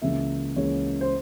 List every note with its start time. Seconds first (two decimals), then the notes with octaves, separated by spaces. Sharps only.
0.02 C#2 C#3 E3 A#3 C#4 E5
0.56 C#2 C#3 E3 A#3 C#4 C#5
1.01 C5